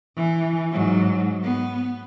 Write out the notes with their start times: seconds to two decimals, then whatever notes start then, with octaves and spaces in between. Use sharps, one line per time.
0.17 E3
0.72 G#2 F#3
1.43 B3